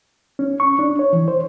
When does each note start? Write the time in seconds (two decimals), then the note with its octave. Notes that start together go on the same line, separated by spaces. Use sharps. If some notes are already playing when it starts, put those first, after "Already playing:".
0.39 C#4
0.60 C#6
0.79 D4
0.99 C#5
1.13 E3
1.28 C5